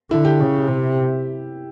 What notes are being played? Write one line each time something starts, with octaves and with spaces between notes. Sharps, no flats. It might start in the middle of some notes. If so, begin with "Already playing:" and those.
D3 E4
G4
C#3
C3